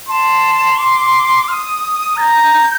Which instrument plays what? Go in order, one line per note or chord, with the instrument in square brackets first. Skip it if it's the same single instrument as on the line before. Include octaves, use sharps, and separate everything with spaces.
[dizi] A5 [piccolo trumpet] C6
[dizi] D6
F6
D#6
[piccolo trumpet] A#5 [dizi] G6 A6